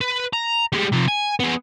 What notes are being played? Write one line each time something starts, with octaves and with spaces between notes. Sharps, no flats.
B4
A#5
G3 G#3
C3 F3
G#5
B3 G#4